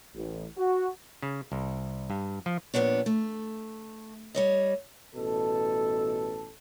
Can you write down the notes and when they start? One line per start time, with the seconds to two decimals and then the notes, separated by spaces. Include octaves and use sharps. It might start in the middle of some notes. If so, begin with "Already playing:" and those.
0.14 A1
0.57 F#4
1.22 C#3
1.52 C2
2.10 G2
2.46 F3
2.74 F2 A#2 D#3 B3 D4 C#5
3.06 A3
4.35 G3 C#5 D#5
5.16 A1 B2 A4